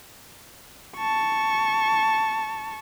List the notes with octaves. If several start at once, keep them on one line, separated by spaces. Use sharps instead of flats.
A5 C#6